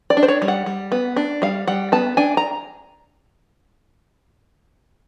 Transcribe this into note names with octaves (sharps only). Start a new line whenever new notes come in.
D5
D4
C5
C#5
G3
F#5
G3
B3
D4
G3 F5
G3 F#5
B3 A5
D4 G#5
A#5